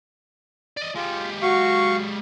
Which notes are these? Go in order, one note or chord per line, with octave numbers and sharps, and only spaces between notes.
D5 D#5
G#3 F4 G4
F#4 F5 C#6